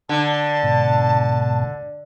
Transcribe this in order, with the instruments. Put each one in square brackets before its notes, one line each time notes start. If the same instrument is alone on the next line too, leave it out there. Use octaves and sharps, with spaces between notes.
[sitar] D3 [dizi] A5
[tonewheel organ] G#2 B2